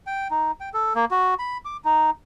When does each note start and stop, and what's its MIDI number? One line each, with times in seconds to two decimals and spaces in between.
0.07 0.28 79
0.31 0.51 63
0.60 0.69 79
0.74 0.93 69
0.95 1.05 58
1.11 1.34 66
1.39 1.58 83
1.65 1.77 86
1.85 2.10 63